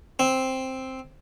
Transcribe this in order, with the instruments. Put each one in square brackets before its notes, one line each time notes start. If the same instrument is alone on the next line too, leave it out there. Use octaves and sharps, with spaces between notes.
[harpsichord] C4